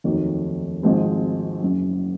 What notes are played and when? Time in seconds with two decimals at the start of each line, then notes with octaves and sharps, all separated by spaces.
0.04 F1 D#2 D#3 F#3
0.83 G#1 G#2 F3 G#3 C4
1.62 F#1 F#2 C#3